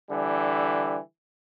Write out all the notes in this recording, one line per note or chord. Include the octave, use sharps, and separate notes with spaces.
D3 E3 G3